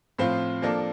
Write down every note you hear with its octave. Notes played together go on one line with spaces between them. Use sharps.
A2 F3 C4 F4
F3 A#3 D4 A4